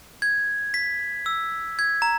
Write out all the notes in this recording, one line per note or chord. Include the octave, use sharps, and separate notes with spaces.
G#6
B6
E6
G#6
A#5